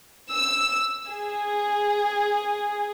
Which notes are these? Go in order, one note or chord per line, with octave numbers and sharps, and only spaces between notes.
E6
G#4